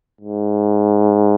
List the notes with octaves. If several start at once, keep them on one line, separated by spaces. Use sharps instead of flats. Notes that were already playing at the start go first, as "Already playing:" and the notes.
G#2